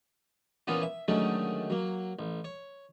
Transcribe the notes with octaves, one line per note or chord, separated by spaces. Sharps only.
A#2 E3 A#3 B3 C#4 F4
E5
D3 D#3 F#3 G#3 A3 C#4
F#3 A#3
A1
C#5